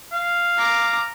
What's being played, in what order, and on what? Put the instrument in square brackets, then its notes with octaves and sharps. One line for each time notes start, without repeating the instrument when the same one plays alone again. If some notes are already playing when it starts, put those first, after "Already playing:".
[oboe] F5
[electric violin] A#5 D6